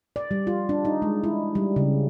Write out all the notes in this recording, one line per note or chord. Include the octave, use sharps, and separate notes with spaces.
D5
G3
F4
D4
D#4
G#3
E4
G3
C#3